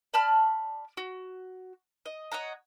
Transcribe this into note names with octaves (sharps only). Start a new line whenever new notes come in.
D5 A5 B5 F6
F#4
D#5
C#5 D#5 F#5 A#5